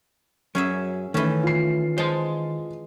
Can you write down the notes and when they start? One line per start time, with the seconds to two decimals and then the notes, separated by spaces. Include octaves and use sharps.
0.55 F#2 F#3 C#4 G#4 E5
1.14 D#3 E3 A3 C#4
1.43 F4 C7
1.98 G#3 C5 A5